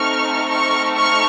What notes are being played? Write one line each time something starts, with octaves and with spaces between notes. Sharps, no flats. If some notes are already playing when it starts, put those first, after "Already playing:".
Already playing: A3 C4 D#4 A4 C#6 F6
C#6 F6
C#6 F6